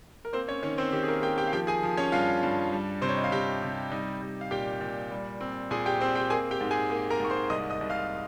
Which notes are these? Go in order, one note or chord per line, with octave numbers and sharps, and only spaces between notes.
A#4
A#3 C4 C5
C#4 C#5
D#3 C#4 C#5
C4 C5
D#3 G4
G#4
A#3 A#4
A#3 G4 G5
G4 G5
F5
F3 G4 G5
G#4 G#5
F3
C#4 C#5
G2 F4 F5
G2
G3
C3 C5
C#5
D#5
F5
C3 G4 G5
C3
G3 D#4 D#5
G3
F5
A#2 G4 G5
A#2
G3
C4
A#2 G#4 G#5
G4 G5
C4 C5
G4 G5
A#3 G#4 G#5
G4 G5
G#2
G#4 G#5
A#3
A#4 A#5
G#2 C#6
C5 C6
C2 D#5 D#6
D#5 D#6
C2
F5 F6